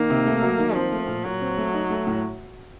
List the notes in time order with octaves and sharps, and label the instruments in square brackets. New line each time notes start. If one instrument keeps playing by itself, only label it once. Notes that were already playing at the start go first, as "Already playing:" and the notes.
Already playing: [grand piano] D#3 [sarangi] A#3
[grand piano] C3
A3
F#3
D#3
[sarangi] F3 [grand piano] C4
[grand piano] A3
A#2
[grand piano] A#2 [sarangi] F#3
[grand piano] C4
A3
D#4
A3
A2